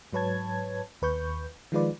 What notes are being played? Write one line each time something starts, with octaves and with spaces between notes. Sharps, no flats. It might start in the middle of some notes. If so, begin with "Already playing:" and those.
G#2 F#3 B4 C#5 A5 G#6
D#2 B4 C#6 G6
D#3 F3 G#3 F4 B4 D5